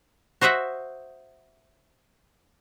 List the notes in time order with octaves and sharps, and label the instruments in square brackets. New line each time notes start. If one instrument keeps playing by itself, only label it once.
[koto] F#4 C5 D#5 E5 F#5